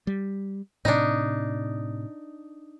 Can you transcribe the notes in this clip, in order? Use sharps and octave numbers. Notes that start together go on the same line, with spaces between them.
G3
A2 C3 D4 D#4